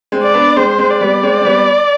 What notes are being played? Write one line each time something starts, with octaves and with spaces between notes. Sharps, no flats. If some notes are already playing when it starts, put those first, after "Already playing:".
G#3 C4
D5
B3 D4
G#3 C4 C5
G#3 C4
D5
G3 B3
G#3 C4
C4
G3 B3